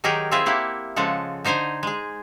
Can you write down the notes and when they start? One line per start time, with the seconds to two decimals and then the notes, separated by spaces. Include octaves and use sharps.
0.04 D#3 F#3 D#4 G4 G#4 A#4
0.31 C4 E4 F4 G#4 E5 F5
0.46 A#3 E4 G4 F#5
0.96 C#3 F3 G#3 A4 F#5
1.44 D3 D#4 C5 G#5 A#5
1.83 G#3 G#4